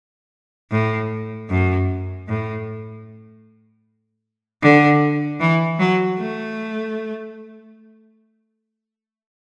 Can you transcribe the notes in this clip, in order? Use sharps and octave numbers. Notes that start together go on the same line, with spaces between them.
A2
F#2
A2
D3
E3
F#3
A3